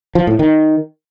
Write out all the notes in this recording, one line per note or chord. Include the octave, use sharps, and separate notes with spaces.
F3
A2
D#3